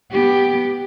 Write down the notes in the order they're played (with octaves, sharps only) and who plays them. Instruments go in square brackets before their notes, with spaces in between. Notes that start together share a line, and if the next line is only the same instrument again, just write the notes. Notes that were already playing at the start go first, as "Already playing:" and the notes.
[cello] B3 G4